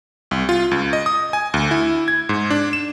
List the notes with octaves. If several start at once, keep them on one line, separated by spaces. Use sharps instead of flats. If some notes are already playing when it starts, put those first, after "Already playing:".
C2
F4
C#2
D#5
D#6
G#5
D2
E4
G#6
G#2
D4
E7